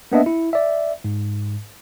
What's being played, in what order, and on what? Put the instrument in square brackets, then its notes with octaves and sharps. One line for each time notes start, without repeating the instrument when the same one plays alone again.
[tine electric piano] A#3 B3 D4 D#5 E5
E4
D5 E5
G#2